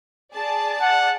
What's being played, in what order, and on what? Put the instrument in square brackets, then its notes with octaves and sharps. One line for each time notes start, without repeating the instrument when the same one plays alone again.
[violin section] G#4 D5 A5
[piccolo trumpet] F#5